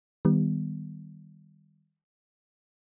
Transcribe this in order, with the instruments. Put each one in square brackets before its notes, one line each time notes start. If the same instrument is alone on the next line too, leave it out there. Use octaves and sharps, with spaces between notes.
[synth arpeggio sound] D#3 G3 B3